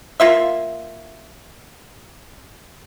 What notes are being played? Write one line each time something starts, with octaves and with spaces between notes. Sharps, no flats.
A#3 F4 E5